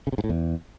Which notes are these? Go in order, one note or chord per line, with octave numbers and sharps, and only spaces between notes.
C#3
C3
G#2
A2
E2